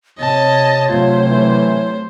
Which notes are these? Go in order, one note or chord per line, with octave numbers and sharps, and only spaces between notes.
C3 C#5 D#5 A5
C3 F#3 A3 F4 C5
E3